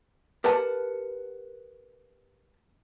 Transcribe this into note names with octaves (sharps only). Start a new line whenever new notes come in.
G4 A#4 B4 F#5 A5